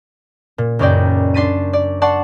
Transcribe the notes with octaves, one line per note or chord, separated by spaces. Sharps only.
A#2
C#2 F#2 C#4 D#4 D5 G5
D4 C6 A6 B6 D#7
D5
D5 F#5 A5 C6 C#6